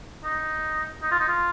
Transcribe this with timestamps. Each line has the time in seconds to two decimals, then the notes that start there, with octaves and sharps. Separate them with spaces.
0.24 D#4
1.02 D#4
1.11 F4
1.19 D#4
1.28 F4